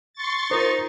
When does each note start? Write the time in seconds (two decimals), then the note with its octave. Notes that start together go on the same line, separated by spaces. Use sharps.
0.14 C6 C#6 A6
0.51 D#4 F4 A#4 C5